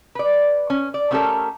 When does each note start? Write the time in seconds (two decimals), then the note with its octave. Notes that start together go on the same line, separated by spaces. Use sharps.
0.15 B4 D5
0.70 C#4
0.94 D5
1.11 A3 B3 C#4 G4 A4 A#4